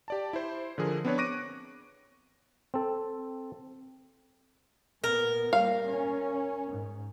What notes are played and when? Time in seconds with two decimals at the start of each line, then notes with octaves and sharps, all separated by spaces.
0.08 G4 D5 A5
0.33 E4 C5
0.78 D3 F3 G#4 A#4
1.05 B3 C4 D4 B4 C#5
1.18 C#6 D6 F#6 A#6 D7 D#7
2.74 C4 A4
5.04 A#2 B3 A#4
5.53 G3 A#3 F5
5.87 C#4
6.71 G#2